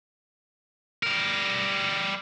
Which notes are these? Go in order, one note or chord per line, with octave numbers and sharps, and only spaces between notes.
G3 A#4